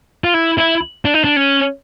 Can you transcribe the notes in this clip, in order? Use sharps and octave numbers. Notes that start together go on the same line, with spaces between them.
F4
E4
E4
D4
D#4
D4
C#4